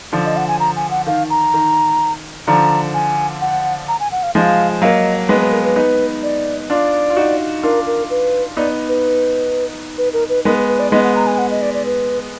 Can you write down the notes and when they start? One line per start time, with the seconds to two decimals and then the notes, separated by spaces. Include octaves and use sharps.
0.12 D3 F3
0.25 D#5
0.37 F#5
0.48 G#5
0.60 A#5
0.76 G#5
0.91 F#5
1.07 D#3 F5
1.30 A#5
1.54 D#3
2.47 D3 F3 A#5
2.94 G#5
3.41 F#5
3.88 A#5
4.00 G#5
4.12 F#5
4.23 F5
4.35 F3 G#3 F5
4.82 F#3 A#3 D#5
5.29 G#3 B3 B4
5.41 B4
5.52 A#4
5.64 B4
5.76 B3 D#4
6.23 D5
6.70 D4 F4 D5
7.10 F4
7.17 D#4 F#4
7.63 D4 F4 A#4
7.87 A#4
8.10 B4
8.57 B3 D#4 D5
8.89 B4
9.98 B4
10.13 A#4
10.29 B4
10.45 G#3 B3 A#4
10.57 B4
10.68 B4
10.80 D5
10.92 G#3 B3 D#5
11.04 F#5
11.15 A#5
11.27 G#5
11.38 F#5
11.51 D#5
11.62 D5
11.74 D5
11.86 B4